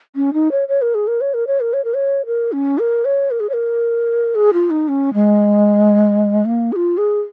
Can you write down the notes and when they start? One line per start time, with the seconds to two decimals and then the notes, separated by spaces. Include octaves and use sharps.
0.16 C#4
0.34 D#4
0.51 C#5
0.68 C#5
0.82 A#4
0.95 G#4
1.07 A#4
1.21 C#5
1.34 A#4
1.47 C#5
1.60 A#4
1.73 C#5
1.84 A#4
1.94 C#5
2.26 A#4
2.52 C#4
2.79 A#4
3.05 C#5
3.31 A#4
3.40 G#4
3.49 C#5
3.53 A#4
4.35 G#4
4.54 F4
4.70 D#4
4.88 C#4
5.14 G#3
6.45 A#3
6.72 G#4
6.76 F4
6.98 G#4